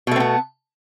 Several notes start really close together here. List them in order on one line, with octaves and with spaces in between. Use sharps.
B2 A3 C4 B3